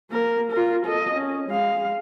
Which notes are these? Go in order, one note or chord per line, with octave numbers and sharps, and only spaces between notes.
A#3 A#4
F4 A#4
A4 D#5
C#4
G#3 F5